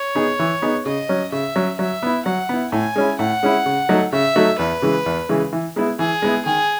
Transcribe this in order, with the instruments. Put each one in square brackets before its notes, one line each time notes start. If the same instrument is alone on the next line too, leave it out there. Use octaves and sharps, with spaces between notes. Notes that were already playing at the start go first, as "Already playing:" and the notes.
Already playing: [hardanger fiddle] C#5
[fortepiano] B3 D#4 G#4
E3
B3 D#4 G#4
[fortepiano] C#3 [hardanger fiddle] D#5
[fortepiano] F#3 C#4
[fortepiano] C#3 [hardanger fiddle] E5
[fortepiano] F#3 C#4
[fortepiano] F#3 [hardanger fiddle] E5
[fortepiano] B3 E4
[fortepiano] F#3 [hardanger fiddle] F#5
[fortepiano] B3 E4
[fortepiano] A2 [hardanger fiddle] G#5
[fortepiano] G#3 C#4 E4
[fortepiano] A2 [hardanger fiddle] F#5
[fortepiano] G#3 C#4 E4
C#3
F#3 A3 D#4 F#4
[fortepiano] C#3 [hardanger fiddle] E5
[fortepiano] F#3 A3 D#4 F#4
[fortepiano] E2 [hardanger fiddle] B4
[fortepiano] C#3 E3 G#3
E2
C#3 E3 G#3
E3
G#3 B3 E4
[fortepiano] E3 [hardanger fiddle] G#4
[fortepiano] G#3 B3 E4
[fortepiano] D#3 [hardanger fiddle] G#4